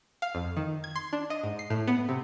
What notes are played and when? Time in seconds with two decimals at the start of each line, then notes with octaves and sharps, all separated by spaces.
0.22 F5
0.35 F2
0.57 D#3
0.84 G#6
0.96 C6
1.13 D4
1.30 D#5
1.44 G#2
1.59 C7
1.70 A2
1.88 B3
2.09 C3